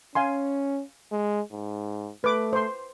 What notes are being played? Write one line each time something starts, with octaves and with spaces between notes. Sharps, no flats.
C#4 F5 G#5 C6
G#3
G#2
A3 B4 D6
C5 C6